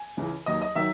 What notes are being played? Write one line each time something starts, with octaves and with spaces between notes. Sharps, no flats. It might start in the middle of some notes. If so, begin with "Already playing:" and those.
Already playing: G#5
C#2 C#3 E3
D#2 D#3 F#3 D#5
D#5
D#3 F#3 E5